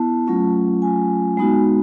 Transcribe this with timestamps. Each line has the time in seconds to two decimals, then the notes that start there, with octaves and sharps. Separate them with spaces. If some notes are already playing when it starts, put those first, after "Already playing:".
Already playing: B3 E4 A5
0.27 F#3 A3 C#4 F4
0.82 G#5
1.37 G#3 B3 D#4 F#4